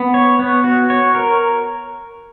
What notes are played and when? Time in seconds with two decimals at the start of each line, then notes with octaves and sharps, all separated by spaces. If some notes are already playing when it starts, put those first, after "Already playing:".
Already playing: B3
0.14 C#5
0.39 B3
0.64 F#4
0.90 C#5
1.15 A#4